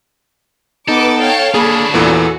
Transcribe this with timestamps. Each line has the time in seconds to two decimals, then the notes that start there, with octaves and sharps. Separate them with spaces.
0.88 B3 D#4 A4 B4 D6
1.19 C#5 F5 G5
1.54 A#3 D4 G#4 A4 C#5 B5
1.94 E2 A#2 E3 F#4 A4